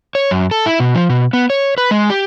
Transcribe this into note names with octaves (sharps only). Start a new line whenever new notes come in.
C#5
F#2
A4
E4
B2
F3
B2
B3
C#5
B4
G#3
G4